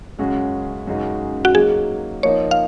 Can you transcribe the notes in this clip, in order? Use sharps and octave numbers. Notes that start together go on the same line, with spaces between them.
F#2 C#3 G#3 C#4 F#4
F#2 C#3 G#3 D#4 F#4
F#4
F#3 A#3 D#4 G#4
F3 A#3 D#4 A#4 C#5 D#5
F5